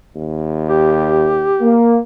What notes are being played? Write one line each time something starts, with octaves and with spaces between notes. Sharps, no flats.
D#2
G4
A#3